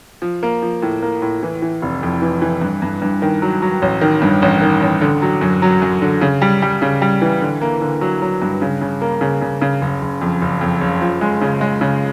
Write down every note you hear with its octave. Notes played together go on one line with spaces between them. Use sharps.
F3
A#3
F3
A2
A#3
A2
E3
E3
F1
F2
E3
E3
G2
G2
G2
D#3
F#3
F#3
A1
D#3
G2
A1
D#3
A1
D3
F#3
F#2
F#3
F#2
D3
C#3
G3
G3
C#3
G3
E3
D3
A#3
D3
F#3
F#3
G2
C#3
C#3
A#3
C#3
C#3
C#3
F#1
F#1
F2
F#1
F2
F#1
F3
G#3
C#3
G#3
C#3